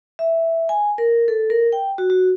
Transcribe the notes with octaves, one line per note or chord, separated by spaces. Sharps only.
E5
G#5
A#4
A4
A#4
G5
F#4
F#4